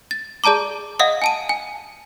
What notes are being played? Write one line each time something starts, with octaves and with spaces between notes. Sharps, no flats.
A6
G#4 D5 A5 A#5 D6
D#5 F5 F#5 D#6
G#5 A5 D#7
G#5